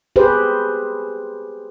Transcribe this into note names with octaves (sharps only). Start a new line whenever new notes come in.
G4 G#4 B4 C5